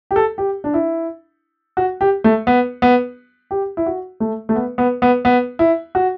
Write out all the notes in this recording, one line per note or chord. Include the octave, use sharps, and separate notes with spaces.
G4
A4
G4
D4
E4
F#4
G4
A3
B3
B3
G4
E4
F#4
A3
A3
B3
B3
B3
B3
E4
F#4